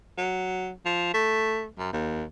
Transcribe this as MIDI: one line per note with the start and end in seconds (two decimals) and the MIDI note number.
0.18 0.72 54
0.85 1.09 53
1.14 1.67 57
1.79 1.90 42
1.93 2.24 39